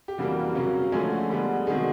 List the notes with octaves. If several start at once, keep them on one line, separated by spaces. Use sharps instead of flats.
G4
F2 C#3 E3 G3 A#3 F#4
C#3 F#3 A#3 C#4
D3 F3 G#3 A3 C#4 G#4
D3 G3 B3
C3 D#3 F#3 G#3 B3 G#4